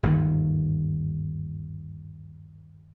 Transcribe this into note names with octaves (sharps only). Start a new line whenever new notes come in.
G1 D#2 G#2 D#3